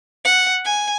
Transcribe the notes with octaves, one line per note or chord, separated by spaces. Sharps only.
F#5
G#5